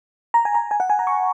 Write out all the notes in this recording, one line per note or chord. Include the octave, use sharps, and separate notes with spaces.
A#5
G#5
A#5
G#5
F#5
G#5
A#5
C#6